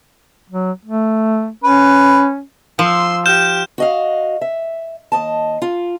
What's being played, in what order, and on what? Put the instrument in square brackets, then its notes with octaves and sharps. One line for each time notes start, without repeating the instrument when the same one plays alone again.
[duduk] F#3
A3
[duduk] C#4 [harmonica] B4
[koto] F3 [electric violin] C6 E6
[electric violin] G4 [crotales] F6 G6 E7
[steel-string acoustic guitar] F#4 D#5 F5
E5
D#2 D#5 A5
F4